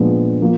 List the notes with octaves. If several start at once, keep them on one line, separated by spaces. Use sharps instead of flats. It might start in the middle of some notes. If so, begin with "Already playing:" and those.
Already playing: A#2 F3 G#3 B3 D4
F3 A#3